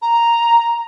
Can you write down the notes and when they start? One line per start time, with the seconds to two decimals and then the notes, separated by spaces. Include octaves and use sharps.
0.02 A#5